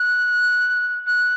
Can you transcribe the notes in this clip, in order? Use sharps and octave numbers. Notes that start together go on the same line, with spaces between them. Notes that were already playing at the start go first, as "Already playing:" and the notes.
Already playing: F#6
F#6